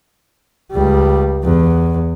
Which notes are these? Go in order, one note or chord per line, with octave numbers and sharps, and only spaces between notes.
C#2 G3
E2